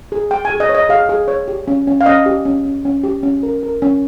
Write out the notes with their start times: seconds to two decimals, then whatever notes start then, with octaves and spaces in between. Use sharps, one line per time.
0.12 G#4
0.31 G#4 G5
0.45 G#4 G#5
0.60 D#5
0.69 C#5
0.75 D#5
0.89 G#4 F5
1.09 G#4
1.28 C#5
1.48 G4
1.67 C#4
1.87 C#4
2.01 F5
2.06 C#4 D#5
2.26 G4
2.45 C#4
2.65 C#4
2.85 C#4
3.04 G4
3.23 C#4
3.43 A#4
3.63 A#4
3.82 C#4